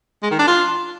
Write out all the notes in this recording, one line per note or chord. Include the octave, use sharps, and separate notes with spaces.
G#3
D#3
D4
F4